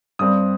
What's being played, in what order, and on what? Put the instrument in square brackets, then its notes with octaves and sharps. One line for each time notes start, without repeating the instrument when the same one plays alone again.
[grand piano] G2 G3 C4 D#6